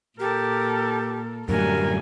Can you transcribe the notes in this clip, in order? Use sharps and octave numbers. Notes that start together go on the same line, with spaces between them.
A#2 G4 A4 A#4
F#2 A2 D3 F#3 G3 A3 A#4 G#5